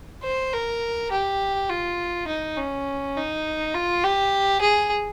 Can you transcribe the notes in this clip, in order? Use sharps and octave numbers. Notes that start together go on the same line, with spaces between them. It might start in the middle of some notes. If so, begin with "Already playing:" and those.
C5
A#4
G4
F4
D#4
C#4
D#4
F4
G4
G#4